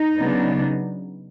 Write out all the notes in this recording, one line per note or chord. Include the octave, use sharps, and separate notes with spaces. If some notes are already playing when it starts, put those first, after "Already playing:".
Already playing: D#4
C#3 F#3 B3 D4